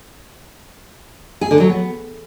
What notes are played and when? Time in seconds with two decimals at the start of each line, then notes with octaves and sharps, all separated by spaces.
1.41 G#4
1.51 D3
1.60 F#3
1.69 B3